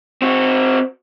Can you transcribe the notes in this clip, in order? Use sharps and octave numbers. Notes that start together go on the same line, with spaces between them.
C4 F#4